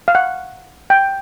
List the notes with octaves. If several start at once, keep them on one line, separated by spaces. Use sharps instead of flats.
F5
F#5
G5